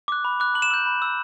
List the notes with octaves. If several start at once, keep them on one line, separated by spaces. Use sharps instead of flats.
D6 F#6
B5
D6 F#6
A#5 F#7
E7
E6 G6 F#7
B5
E6 G6